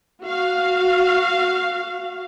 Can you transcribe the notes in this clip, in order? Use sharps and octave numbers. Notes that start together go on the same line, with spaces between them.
F#4 F5